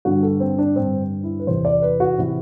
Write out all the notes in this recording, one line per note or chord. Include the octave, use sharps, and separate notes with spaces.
G2 D3 F#4
A4
C4
D4
G2 D3 C4
E4
B4
E2 C3 E3 C5
D5
B4
F#4
C3 E3 E4